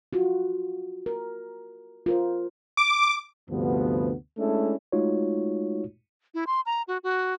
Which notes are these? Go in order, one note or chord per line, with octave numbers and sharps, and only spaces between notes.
F4 F#4
A#4
F4 A#4 C5
D6
D2 G2 C3 F3 B3
G#3 A3 C#4 D4 E4 A4
G#3 A3 D#4 F4 F#4 C#5
E4
C6
A#5
F#4
F#4